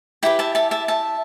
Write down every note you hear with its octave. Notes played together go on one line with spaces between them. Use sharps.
E4 G4 B4 G5
E5 A5
E5 A5
E5 A5
E5 A5